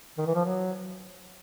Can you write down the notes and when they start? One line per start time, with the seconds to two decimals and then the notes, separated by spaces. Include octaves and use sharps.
0.18 D#3
0.26 E3
0.35 F3
0.45 F#3